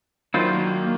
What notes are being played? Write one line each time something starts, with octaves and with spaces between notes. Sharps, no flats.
D#3 F#3 D4 E4 F4 C5
A#3